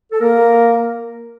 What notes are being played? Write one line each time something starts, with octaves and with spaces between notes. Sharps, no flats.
A4
A#3 A#4